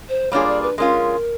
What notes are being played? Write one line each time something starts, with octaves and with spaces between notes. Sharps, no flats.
C5
G3 A#3 D4 F4 G#4 C#5
D5
B4
G#3 C#4 F4 A#4